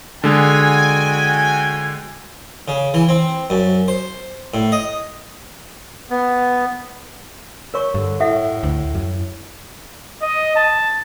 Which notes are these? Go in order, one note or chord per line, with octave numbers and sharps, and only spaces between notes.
D3 G#3 F#4 G5 G#5
C#3
E3
C4
F#2
C5
A2
D#5
B3
A#4 C#5 C#6
G2 D3
A2 A4 E5 F#5
D2
F#2
D#5
A5